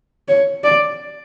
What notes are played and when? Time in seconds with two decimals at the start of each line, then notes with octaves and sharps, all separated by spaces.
0.29 C#5
0.64 D5